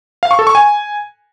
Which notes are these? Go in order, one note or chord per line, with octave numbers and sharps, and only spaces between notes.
F5
C#6
A4
C#6
G#5